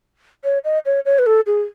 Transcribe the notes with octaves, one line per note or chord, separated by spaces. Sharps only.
C#5
D#5
C#5
C#5
B4
A4
G#4